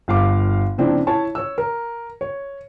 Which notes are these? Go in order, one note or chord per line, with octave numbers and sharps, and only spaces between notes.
G1 F5 D6
A#2 C#3 F3 C4 D4 E4
E4 C#5 A5
C#5 E6
A#4
C#5